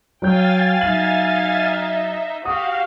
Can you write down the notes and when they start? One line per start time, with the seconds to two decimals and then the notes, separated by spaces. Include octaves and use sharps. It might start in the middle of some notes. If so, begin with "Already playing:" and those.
0.22 F#3 C#5 F5 G5 G#5 G6 A6
0.81 F#3 D#4 E5 F#7
2.45 F#4 G4 F5 D#6